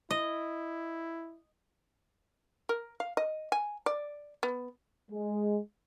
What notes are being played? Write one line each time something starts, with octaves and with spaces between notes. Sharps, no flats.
E4 D#5
A#4
F5
D#5
G#5
D5
B3
G#3